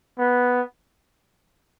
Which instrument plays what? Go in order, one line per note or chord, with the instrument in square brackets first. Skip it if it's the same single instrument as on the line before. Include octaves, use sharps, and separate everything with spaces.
[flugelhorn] B3